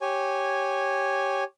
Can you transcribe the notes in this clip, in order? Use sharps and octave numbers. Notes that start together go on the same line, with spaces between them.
G4 C#5 G#5